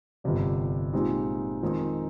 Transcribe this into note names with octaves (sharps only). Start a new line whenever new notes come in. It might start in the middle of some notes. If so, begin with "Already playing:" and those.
G1 F2 C3 G3
A#2 G#3 C4 D#4 G4
F2 D#3 G#3 C4 D#4